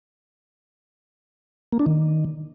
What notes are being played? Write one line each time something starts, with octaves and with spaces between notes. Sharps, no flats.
A#3
D4
D#3